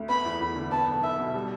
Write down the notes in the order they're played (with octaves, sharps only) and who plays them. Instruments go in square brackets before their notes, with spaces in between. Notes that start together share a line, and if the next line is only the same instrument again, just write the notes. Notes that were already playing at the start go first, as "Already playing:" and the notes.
Already playing: [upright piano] D2
[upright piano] B3 [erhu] B5
[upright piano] E2
E2
D3
[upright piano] B3 [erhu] A5
[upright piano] B1
[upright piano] B1 [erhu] E5
[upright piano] B2
G3